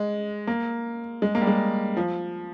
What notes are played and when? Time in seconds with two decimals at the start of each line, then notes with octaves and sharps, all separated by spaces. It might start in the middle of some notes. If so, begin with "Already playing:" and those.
Already playing: G#3
0.47 A#3
1.22 G#3
1.35 A#3
1.41 G3
1.47 G#3
1.97 F3